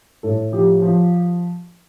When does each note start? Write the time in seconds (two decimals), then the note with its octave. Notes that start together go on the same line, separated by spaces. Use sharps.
0.23 A2 A4
0.52 F3 G4
0.82 F3